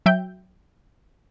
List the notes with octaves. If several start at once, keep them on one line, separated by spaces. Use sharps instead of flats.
F#3 E5 G5 G6